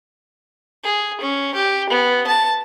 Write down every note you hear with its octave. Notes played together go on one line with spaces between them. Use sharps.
G#4
C#4
G4
B3
A5